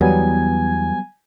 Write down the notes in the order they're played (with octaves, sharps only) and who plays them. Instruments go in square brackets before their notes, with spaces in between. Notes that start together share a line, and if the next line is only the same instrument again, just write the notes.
[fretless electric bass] E2 [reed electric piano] F#3 G3 B3 [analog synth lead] G#5